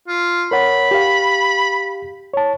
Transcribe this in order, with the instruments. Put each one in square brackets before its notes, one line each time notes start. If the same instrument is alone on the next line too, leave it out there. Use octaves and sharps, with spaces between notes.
[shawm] F4
[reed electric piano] A#4 C#5 F#5 [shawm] B5
[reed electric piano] G4 F5
C#5 A5